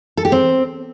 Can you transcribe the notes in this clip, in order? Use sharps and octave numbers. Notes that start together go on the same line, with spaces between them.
A4
G4
C4